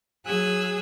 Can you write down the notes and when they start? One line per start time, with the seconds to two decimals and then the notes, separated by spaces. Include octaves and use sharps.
0.25 F#3 G#4 E6 F#6 G#6